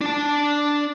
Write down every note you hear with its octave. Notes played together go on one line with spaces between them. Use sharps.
D4 A5